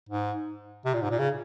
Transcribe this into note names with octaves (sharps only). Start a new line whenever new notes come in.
G#2
C3
A#2
G#2
A#2
C#3